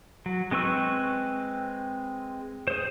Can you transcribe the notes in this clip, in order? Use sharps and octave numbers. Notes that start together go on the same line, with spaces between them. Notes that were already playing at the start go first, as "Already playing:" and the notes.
F#3
G#3 C4 B4 C#6 E6
G#4 C5